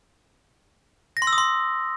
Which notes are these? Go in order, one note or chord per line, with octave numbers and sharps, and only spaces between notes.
A#6
C6
E6
D#6
C6